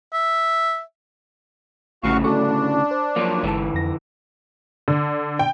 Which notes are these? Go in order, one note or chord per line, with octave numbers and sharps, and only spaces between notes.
E5
A1 D2 A2 C#3 F#4 F5 C#6
D4 F#4 A4 C#6
C5
F3 F#3 A#3
G1 D3 E3 G#3 A5
F2 A#6
D3
G5